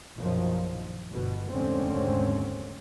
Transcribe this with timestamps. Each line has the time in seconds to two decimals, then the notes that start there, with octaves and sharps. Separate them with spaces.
0.18 A#1 F#2 B2 D#3 F3
1.13 G1 B2
1.51 F1 D#2 G#2 D3 C4 C#4